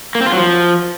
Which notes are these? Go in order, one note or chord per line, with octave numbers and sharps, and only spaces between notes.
A#3
C4
F4
F#3
F3